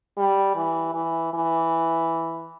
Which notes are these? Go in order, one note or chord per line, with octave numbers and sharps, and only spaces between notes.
G3
E3
E3
E3